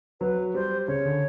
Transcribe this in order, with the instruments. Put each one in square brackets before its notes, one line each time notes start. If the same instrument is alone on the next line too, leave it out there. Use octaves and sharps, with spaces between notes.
[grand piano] F#3 [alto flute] B4
[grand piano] G3 [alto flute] C5
[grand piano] C#3 [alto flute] C#5
[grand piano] D3